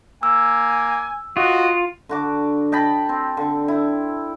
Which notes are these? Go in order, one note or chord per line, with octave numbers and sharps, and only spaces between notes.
A#3 G#5 E6
F4 F#4 D#5
D3 F#4 D6
D#5 G5 A5 B5
C4
D3
E4